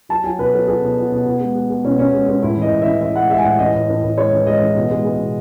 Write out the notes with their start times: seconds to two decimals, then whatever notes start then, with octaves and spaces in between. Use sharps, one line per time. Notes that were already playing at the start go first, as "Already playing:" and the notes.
0.09 F#3 A5
0.24 F#3 G#5
0.39 B2 B4
0.53 F#3 A4
0.67 F#3 G#4
0.82 B2
0.97 F#3
1.12 B2
1.26 B2
1.40 G#3
1.55 G#3
1.70 G#3
1.84 B2 C#4
1.99 B2 C#4
2.13 G#3
2.27 G#3 C#4
2.43 A2 E4
2.57 E3 D#5
2.72 A2
2.82 E3 E5
3.00 E3 E5
3.16 G#3 F#5
3.30 G#3 E5
3.38 G#5
3.44 A2 F#5
3.59 E3 D#5
3.74 A2
3.89 A2
4.03 A2
4.18 G#3 C#5
4.32 E3
4.46 G#3 D#5
4.61 E3
4.75 B2
4.90 G#3
5.05 G#3
5.19 B2